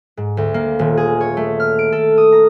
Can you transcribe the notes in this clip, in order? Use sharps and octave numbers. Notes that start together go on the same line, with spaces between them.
G#2
D2
A#3
D#1
G#4
C#5
A3
F6
D7
A4
D#6
A#5